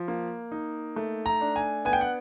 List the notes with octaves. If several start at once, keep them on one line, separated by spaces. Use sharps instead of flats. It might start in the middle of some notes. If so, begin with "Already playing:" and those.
Already playing: F3
A#3
D#4
A3
A#5
D4
G#5
B3 G#5
G5
F#5